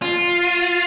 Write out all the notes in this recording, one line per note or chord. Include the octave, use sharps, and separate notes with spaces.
F4